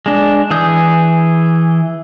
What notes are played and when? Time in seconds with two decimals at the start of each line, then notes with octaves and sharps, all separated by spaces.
0.06 G#3 D4
0.51 E3 G#4 G6